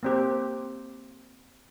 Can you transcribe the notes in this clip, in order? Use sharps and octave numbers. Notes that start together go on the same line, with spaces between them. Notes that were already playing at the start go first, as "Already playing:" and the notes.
A#3 C4 G4